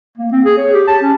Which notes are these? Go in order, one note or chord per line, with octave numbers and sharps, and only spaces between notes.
A#3
C4
G#4
C#5
G4
A5
C#4